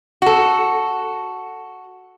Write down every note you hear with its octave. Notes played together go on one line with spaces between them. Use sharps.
F#4 A4